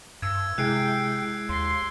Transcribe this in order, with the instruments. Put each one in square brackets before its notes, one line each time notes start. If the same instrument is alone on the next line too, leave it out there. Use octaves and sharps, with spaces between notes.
[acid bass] G2 [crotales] E6 G#6
[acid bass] C3 [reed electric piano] G#3 E4 G#4 [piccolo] G5 [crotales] F#6 C7 D7
[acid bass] D#2 [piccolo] C6